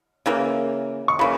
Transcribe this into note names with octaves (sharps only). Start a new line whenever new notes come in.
C#3 E3 A#3
C#6
C#3 E3 A#3 B5